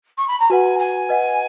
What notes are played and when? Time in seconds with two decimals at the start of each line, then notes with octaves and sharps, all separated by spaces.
0.17 C#6
0.28 B5
0.40 A#5
0.50 F#4 B4 F#5 G#5
0.79 G#5
1.09 B4 D#5 F#5